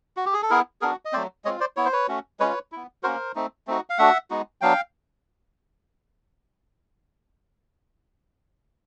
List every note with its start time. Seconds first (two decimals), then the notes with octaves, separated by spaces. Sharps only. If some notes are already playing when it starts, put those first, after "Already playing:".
0.17 F#4
0.26 G4
0.33 G#4
0.42 A4
0.50 B3 E4 G#4 A#4
0.81 B3 D4 F#4 G#4 A#4
1.05 D#5
1.13 F#3 A3 C4 C5 D5
1.45 G#3 C4 F4 C#5 D#5
1.60 C5 D5
1.77 B3 E4 C#5
1.85 C5
1.93 B4 C#5
2.08 A3 C#4 F#4
2.40 G#3 C#4 F4 B4 C#5
2.72 B3 E4
3.03 A#3 C#4 F#4 A#4 C5
3.35 A3 C4 D#4
3.67 A3 C4 D#4 F#4
3.90 F5
3.98 A3 D4 F#4 E5 F#5
4.30 G#3 B3 D#4 F#4
4.61 F#3 B3 D4 F5 G5